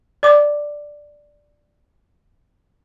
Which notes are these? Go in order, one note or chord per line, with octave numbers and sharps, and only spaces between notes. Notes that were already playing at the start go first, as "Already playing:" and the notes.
D5 D6